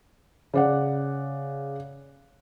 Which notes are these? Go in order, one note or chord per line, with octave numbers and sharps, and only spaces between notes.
C#3 D5 F#5